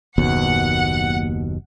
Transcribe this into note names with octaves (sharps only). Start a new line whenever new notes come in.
F#1 D#2 B2 F#5